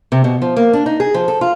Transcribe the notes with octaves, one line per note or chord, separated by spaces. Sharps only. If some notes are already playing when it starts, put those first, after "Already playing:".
C3
B2
F3
A#3
D4
D#4
G#4
F3
A4
F4